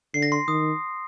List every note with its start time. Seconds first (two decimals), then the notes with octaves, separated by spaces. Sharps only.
0.14 D3 C7
0.23 A#6
0.32 C6
0.48 D#3 D#6